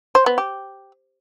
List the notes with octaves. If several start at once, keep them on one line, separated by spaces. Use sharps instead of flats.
C5
B3
G4